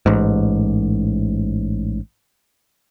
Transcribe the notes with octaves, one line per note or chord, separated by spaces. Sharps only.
A1 G#2